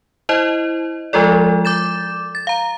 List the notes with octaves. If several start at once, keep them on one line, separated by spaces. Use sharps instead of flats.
E4 C5 D#5
F3 G#3 F4 A4 D5
D6 G6 A6 E7
A6
F5 A#5